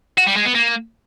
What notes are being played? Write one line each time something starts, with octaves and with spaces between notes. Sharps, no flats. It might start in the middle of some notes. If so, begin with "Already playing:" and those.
F#4
G3
G#3
B3
A#3